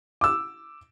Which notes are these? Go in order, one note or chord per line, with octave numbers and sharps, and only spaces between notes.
D6 E6